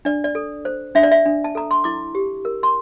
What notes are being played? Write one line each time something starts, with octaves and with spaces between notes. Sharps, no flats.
D4 D5
D5
A4
C5
D4 E5
D5
E5
D4
A5
A4 A#5
C6
E4 D6
G4
A#4
C6